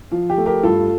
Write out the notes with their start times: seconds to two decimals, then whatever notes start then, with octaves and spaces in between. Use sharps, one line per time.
0.11 F3 F4
0.30 G4
0.38 A3
0.46 G4 A#4
0.63 G2 F4 A4